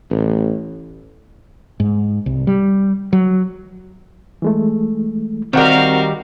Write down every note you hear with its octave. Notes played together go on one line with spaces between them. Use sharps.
A1
G#2
C2
G3
F#3
E3 G#3 A3
D#3 G3 C4 F#4 A#4 F5 F#5